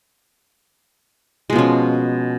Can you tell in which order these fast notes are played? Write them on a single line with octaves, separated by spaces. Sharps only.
G#3 B2 F3 C#4